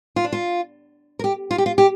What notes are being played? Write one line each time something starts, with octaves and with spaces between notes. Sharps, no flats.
F4
D4
F4
A#4
G4
F4
G4
F4
G4